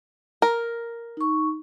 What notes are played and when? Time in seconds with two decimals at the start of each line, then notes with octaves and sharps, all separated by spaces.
0.42 A#4
1.17 D#4 C#6